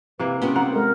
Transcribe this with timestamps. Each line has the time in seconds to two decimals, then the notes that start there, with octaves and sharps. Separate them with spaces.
0.19 C3 A#3 E4 B4
0.42 G3 B3 C#4 F4
0.56 C4 F#5 A#5
0.73 G#3 A4 A#4